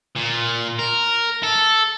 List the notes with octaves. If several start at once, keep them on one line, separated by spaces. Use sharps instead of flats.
A#2
A#4
A4